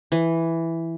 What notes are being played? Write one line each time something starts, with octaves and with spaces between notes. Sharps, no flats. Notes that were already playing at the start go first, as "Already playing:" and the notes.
E3